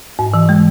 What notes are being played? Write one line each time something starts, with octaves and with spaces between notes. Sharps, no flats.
G#2
E3
G#3